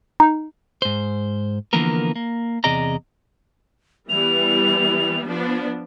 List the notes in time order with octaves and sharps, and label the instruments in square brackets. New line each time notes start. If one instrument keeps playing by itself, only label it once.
[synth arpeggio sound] D#4
[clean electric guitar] G#2 C5
D3 E3 F3 A#3 B3 A#4
A#3
E2 C3 G#4 D5 D#5 A#5
[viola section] E3 G3 B3 [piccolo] F7
[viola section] F3 B3 D4